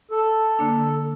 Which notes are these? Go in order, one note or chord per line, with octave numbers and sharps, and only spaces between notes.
A4
D3 A#3 D4